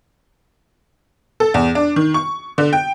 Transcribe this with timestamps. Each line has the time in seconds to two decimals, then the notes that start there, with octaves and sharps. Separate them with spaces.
1.40 A4
1.54 E2
1.75 D4
1.96 D#3
2.14 C#6
2.58 D3
2.73 G5